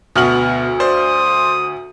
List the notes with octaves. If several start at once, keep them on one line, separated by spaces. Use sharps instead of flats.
D2 B2 B3 F6 F#7
C5 D5 D#6